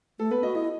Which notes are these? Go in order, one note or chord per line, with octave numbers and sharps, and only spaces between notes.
A3 A4
B3 B4
F#4 D#5
E4 D#5